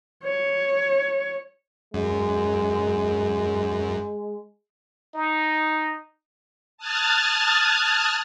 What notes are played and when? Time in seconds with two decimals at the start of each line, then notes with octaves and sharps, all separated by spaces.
0.23 C#5
1.94 F#2 G#3
5.14 D#4
6.78 A5 D#6 F6 F#6 G#6 A6